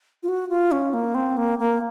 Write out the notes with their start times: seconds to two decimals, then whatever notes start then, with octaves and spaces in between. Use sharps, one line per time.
0.23 F4
0.28 F#4
0.49 F4
0.72 C#4
0.93 A#3
1.14 C4
1.37 A#3
1.59 A#3